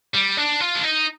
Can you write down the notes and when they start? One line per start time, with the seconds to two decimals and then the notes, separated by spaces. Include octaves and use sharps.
0.15 G3
0.38 D4
0.61 F4
0.75 D4
0.84 D#4